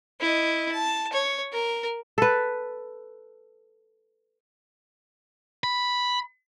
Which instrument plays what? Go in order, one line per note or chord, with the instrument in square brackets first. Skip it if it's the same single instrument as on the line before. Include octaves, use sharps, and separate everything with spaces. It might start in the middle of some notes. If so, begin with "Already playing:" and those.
[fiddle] E4 D#5
A5
C#5
A#4
[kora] A4 B4
[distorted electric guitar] B5